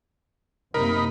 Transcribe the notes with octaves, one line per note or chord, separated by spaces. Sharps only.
F#2 C3 A#3 D#4 A#4 B5